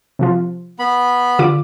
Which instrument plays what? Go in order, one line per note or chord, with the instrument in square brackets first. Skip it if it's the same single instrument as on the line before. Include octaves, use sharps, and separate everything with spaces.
[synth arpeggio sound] C3 F3 F4
[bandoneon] B3 B5
[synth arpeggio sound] D3 F4 D6